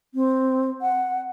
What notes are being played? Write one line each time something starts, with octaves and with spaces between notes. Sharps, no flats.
C4
F#5